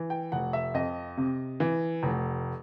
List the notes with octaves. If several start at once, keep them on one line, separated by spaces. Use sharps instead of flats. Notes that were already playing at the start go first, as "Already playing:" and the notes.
Already playing: E3
G5
F1 F#5
E5
F2 D#5
C3
E3
F1